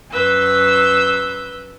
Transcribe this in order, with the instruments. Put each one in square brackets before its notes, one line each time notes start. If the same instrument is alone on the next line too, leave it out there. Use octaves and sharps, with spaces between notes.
[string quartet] F#2 B4 E6 G6